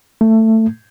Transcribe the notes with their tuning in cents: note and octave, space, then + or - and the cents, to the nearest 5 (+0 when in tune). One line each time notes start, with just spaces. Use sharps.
A3 +15